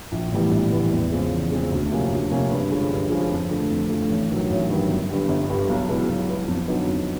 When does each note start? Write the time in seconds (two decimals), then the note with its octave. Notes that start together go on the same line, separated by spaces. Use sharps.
0.12 A#1
0.31 A2 E3 G3 B3
0.51 A#1
0.72 A2 E3 G3 B3
0.91 E2
1.11 C#3 F3 G#3 C4
1.31 E2
1.51 C#3 F3 G#3 C4
1.72 D2
1.92 C3 F3 A#3 C#4
2.11 D2
2.30 C3 F3 A#3 C#4
2.51 G2
2.70 D3 F3 G#3 C#4
2.90 G2
3.10 D3 F3 G#3 C#4
3.31 F2
3.50 D3 F3 A3
3.70 F2
3.89 D3 F3 A3
4.10 A1
4.30 G2 D#3 F#3
4.50 A1
4.70 G2 D#3 F#3
4.90 G1
5.09 G2 D3 G3
5.28 G1
5.48 G2 D3 G3
5.69 B1
5.89 B2 G#3 B3 E4
6.09 B1
6.28 B2 G#3 B3 E4
6.48 F2
6.68 D3 F#3 B3 D#4
6.88 F2